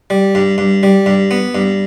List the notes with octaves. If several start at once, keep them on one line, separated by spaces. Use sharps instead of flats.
G3
G2
G2
G3
G2
B3
G2